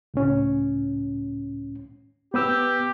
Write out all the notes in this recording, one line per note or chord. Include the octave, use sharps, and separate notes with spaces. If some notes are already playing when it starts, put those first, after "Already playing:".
C#2 A2 C#4
B3 G4 B4 E6